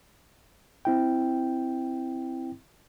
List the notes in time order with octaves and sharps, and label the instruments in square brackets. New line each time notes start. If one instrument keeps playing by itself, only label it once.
[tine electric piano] C4 E4 G5